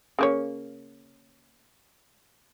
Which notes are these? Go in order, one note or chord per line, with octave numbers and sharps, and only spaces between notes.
C#3 A#3 C#5